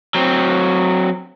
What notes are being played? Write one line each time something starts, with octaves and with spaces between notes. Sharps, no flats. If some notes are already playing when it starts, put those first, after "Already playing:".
F#3 C4